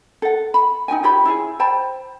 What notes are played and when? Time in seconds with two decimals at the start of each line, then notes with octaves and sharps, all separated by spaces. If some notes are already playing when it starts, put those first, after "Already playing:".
0.22 A4 F#5
0.54 B5
0.88 D#4 F#4 G5 G#5
1.03 F4 G4 C#5 B5
1.25 E4 F4 G#4 G#5
1.59 C5 G5 A5 B5